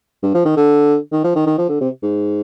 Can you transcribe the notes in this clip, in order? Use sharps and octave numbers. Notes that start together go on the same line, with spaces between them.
G2
F3
D#3
D3
D#3
F3
D#3
D#3
F3
D3
C3
G#2